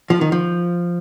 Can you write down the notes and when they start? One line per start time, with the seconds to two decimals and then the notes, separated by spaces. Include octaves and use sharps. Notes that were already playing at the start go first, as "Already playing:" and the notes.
0.10 F3
0.21 D#3
0.32 F3